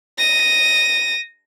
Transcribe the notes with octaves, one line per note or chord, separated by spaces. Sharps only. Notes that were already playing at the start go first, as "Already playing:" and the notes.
A#6 D#7